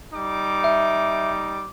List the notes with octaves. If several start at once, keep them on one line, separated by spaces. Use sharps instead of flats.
G3 D#4 D6
E5